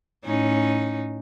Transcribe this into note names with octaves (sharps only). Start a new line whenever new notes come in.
A2 C#4 D#4